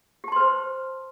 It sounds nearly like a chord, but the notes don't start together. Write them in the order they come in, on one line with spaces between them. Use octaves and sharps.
G4 A5 C6 B4 C5